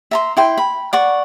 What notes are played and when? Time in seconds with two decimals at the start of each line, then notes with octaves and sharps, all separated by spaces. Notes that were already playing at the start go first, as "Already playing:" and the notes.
0.11 E5 A#5 C6
0.37 E4 G5 C6
0.58 B5
0.93 D5 F#5 C#6